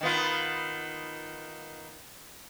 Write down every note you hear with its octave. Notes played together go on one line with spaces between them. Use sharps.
D#3 B3 F4